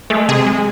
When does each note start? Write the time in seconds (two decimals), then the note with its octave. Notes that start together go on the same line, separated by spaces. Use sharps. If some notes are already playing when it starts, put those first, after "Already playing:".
0.10 G#3 A3
0.29 C3 G#4
0.46 G#3